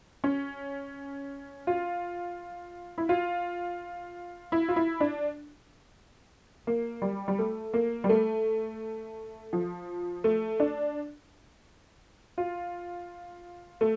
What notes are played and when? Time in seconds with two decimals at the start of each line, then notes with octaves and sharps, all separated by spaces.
0.24 C#4
1.67 F4
2.98 E4
3.09 F4
4.52 E4
4.68 F4
4.76 E4
5.00 D4
6.67 A#3
7.02 G3
7.28 G3
7.39 A3
7.74 A#3
8.04 G3
8.09 A3
9.53 F3
10.24 A3
10.60 D4
12.38 F4
13.81 A3